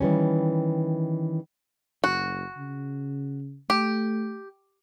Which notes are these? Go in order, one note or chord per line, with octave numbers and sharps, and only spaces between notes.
D#3 E3 G3 C#4
F#1 F#4
C#3
A3 G4